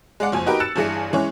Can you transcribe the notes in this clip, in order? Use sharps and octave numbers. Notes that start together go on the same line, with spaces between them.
G#3 D5 F#5
F#1 F2 G#5
D#4 F#4 G4 A#4 B4 G5
E6 F#6 A6 C#7 E7
G1 G2 E3 G#4 A#6 C#7
E3 G#3 C#4 C#5